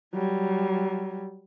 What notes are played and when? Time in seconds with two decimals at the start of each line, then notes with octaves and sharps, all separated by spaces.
0.14 F#3 G3